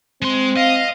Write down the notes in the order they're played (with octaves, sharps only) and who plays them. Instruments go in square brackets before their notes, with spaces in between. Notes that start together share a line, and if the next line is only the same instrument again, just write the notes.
[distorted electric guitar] G#3 C6 [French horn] C4
[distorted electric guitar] D#5 [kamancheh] F5